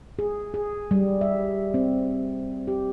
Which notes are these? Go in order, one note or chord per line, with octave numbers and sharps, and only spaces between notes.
G#4
G#4
G3
E5
C4
G4